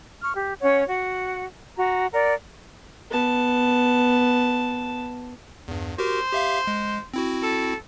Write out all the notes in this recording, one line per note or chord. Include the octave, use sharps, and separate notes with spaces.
C#6 F6
G4
C#4 C#5 F#5
F#4 F#5
F#4 A#5
A#4 D5 F#5
B3 A5
E2 G2
F#4 G4 A#4 C5
G4 E5 F5
G#3
C4 E4 F#4
A4